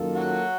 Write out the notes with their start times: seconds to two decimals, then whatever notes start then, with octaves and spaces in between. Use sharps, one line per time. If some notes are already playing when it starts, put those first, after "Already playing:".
Already playing: F#2 D#3 A#3 F4 A4
0.15 F#3 F#4